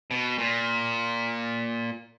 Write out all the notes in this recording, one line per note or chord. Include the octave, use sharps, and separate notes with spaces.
B2
A#2